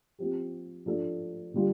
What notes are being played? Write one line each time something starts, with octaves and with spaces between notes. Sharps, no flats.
F3 C4 G4
F3 D4 A4
D3 G3 F4